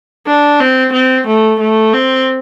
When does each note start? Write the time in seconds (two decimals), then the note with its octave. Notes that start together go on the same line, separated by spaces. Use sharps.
0.27 D4
0.60 C4
0.93 C4
1.27 A3
1.60 A3
1.93 C4